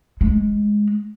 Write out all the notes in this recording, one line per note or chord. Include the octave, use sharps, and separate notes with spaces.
G#3